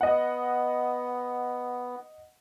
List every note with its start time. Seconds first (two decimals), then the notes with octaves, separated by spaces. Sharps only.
0.01 B3 D#5 F#5